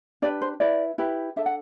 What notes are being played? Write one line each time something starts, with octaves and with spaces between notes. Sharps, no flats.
D4 G4 B4 D5
C5
E4 B4 D5
E4 G4 B4
D4 A4 E5
F#5